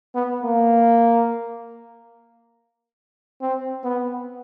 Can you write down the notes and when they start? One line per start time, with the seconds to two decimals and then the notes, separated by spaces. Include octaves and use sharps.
0.15 B3
0.43 A#3
3.41 C4
3.84 B3